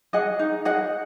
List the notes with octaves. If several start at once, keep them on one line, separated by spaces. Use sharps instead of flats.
G#4 D#5 F#5
D#4
G#4 D#5 F#5